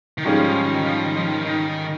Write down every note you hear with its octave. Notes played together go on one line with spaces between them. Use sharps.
D#3
G#2 F3 G3 C#4 F4 G#4
F3
D#3
F3
D#3
F3
D#3
D#3